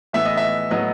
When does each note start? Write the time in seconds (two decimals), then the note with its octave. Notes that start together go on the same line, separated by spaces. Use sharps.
0.13 A2 E3 B3 E5
0.25 D#5
0.37 E5
0.70 A2 F#3 B3 D#5